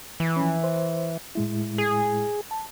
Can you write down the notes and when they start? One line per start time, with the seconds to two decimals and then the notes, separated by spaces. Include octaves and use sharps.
0.20 E3
0.36 F3 C#4
0.64 C5
1.35 A2 G#3 E4
1.78 G#4
2.51 A5